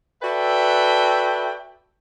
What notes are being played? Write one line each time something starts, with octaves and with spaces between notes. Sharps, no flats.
F#4 A4 B4 D5 E5 G5